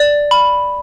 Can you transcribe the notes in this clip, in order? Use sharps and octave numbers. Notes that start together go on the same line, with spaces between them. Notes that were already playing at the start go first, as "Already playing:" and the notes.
Already playing: D5
B5